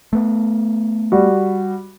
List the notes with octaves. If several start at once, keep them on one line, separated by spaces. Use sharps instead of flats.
A3 B3
G3 F#4